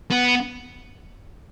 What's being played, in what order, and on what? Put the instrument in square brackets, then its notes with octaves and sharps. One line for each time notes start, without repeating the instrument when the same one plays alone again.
[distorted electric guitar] B3